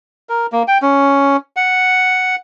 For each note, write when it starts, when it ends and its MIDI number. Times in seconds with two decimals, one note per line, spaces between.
0.29 0.46 70
0.52 0.63 58
0.68 0.78 79
0.82 1.37 61
1.56 2.36 78